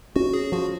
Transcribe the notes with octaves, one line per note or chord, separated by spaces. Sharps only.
C#4 F#4
G#4
F3 F#4